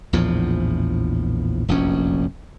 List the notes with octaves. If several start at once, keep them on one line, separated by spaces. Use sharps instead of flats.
A#1 E2 A2 F3
F1 A#1 F#2 C#4